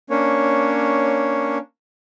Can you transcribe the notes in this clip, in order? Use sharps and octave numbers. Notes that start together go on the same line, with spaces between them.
A#3 C#4 D4 C#5